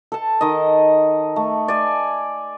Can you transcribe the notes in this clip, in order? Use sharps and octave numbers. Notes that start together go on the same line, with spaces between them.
A4 A5
D#3 D#5
A3
D5 G#5